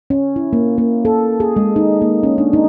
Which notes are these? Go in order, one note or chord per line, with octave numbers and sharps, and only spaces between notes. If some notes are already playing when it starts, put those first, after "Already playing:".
C#4
E4
A#3
A#3
A4
G#4
G#3
D#4
A#3
C#4
D4
D#4